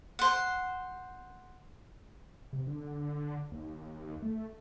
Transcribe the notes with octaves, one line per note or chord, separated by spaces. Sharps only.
C5 F#5
C3
D3
D#2
A3